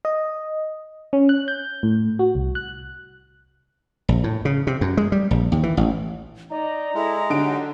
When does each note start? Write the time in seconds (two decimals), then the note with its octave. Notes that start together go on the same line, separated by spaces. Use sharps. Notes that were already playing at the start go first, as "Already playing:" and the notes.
0.05 D#5
1.13 C#4
1.29 F#6
1.48 G6
1.83 A2
2.19 F#4
2.35 C2
2.55 F#6
4.09 A#1
4.24 A2
4.45 C#3
4.67 C3
4.81 F#2
4.97 G#3
5.12 G3
5.31 A#1
5.52 D#2
5.63 E3
5.77 A1
6.50 D#4 D5 A#5
6.94 G#3 E4 A4
7.30 D3 F#3 D#4 G4 D7